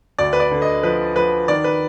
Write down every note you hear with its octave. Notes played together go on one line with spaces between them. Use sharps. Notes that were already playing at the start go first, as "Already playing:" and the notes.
D2 D5
B4
D5
D3
D#5
F3 B4
F3 B4
D#3 D5
B4